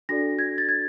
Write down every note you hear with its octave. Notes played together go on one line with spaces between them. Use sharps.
D4 F#4 A4 D5 A#6
G#6
A6
G#6